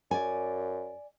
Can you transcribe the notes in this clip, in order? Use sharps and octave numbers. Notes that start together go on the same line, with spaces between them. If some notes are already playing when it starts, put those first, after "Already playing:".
F#2 D5 G#5